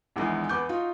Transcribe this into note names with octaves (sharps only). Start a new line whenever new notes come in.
A#1 E2 D#3 E3 G#3
E2 B3 D6 G6
D#4 F4 F#4